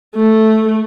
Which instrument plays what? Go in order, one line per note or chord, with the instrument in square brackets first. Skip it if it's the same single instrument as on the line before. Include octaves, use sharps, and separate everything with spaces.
[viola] A3